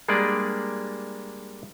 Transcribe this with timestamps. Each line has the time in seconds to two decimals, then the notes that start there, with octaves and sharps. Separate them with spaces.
0.08 G3 G#3 A#3 D4 G#4 D5